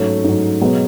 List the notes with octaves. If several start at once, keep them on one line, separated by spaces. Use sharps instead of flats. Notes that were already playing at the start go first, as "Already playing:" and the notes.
Already playing: G#2 F#3 A3 C#4
G#2 F#3
B2 F#3 G#3 B3